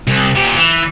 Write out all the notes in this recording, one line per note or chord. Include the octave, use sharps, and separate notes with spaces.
C2
A#2 G4
E3